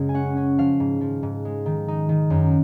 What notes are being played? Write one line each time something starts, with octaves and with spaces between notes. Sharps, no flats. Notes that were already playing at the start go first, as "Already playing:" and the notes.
Already playing: F#2 C#3 G#3
G#5
C#4 F#5
C#4
F3 F5
G#2
F3
G#2
G#3
D#3
D#4
D#3
F#2